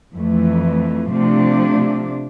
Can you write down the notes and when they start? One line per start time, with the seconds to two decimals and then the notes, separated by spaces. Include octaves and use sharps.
0.13 F2 E3 A3
1.10 C3 F3 A3 D4